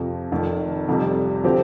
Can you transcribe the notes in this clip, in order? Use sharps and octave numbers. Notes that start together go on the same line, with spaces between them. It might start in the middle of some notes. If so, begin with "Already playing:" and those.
Already playing: F2 C3 F3
F1 F2 D#3
F1 F2 C3 G3
D3 F3 C4 G4